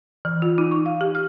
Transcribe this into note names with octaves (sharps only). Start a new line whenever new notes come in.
E3
F4
D#4
C#6
F5
G4
F6